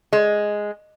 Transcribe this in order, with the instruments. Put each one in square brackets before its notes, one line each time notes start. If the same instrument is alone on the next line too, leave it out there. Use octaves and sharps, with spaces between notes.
[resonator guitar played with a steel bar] G#3